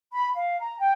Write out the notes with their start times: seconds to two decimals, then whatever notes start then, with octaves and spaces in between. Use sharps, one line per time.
0.13 B5
0.35 F5
0.60 A#5
0.79 G5